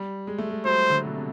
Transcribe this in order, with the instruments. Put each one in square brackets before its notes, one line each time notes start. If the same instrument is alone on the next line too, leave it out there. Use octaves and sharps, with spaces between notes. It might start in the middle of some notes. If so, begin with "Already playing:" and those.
Already playing: [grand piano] G3
G#3
A3
G#3
[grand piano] F#3 [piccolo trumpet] C5
[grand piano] D3
B2
C3